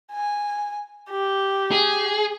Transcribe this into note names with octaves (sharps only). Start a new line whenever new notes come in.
G#5
G4
G#4